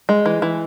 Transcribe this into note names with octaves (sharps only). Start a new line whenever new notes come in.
G#3
E3
E3